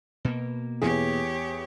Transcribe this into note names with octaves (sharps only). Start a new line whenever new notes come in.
B2 A#3
E2 E3 G4 G#4 C#5